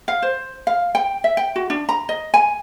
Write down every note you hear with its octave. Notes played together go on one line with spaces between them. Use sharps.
F5
C5
F5
G5
E5
G5
F#4
D4
A#5
D#5
G#5